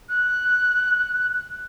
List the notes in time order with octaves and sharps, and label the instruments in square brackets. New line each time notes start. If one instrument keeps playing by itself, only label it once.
[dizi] F#6